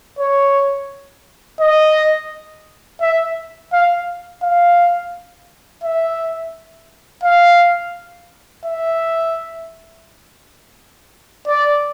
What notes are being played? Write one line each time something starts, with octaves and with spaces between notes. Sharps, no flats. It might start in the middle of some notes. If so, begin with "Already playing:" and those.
C#5
D#5
E5
F5
F5
E5
F5
E5
D5